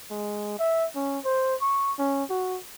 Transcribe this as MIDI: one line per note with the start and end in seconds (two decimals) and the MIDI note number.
0.11 0.58 56
0.59 0.86 76
0.95 1.19 61
1.25 1.55 72
1.61 1.92 85
1.99 2.24 61
2.30 2.58 66